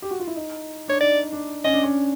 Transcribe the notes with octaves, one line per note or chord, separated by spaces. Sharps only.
G4
F#4
F4
E4
D#4
D4 C#5
D#4 D5
D4
C#4 D#5
D4
C#4